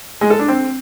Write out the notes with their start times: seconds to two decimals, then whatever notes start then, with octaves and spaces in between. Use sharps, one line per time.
0.21 G#3
0.30 A4
0.39 D4
0.48 C4